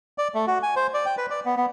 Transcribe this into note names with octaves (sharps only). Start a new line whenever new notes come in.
D5
A3
F#4
G#5
C5
D5
G5
B4
D5
B3
B3